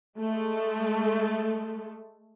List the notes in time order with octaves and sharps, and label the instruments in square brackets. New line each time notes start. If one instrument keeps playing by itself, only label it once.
[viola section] G#3 A3 A4